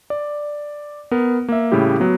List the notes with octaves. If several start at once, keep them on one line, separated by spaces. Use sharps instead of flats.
D5
B3 A#4
A#3 E5
A2 C#3 G3 E4 G4
F#3 B3